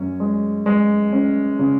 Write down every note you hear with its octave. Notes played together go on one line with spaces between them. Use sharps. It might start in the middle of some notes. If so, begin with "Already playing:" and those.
Already playing: F#2 C#4
G#3
G#3
C#4
C#3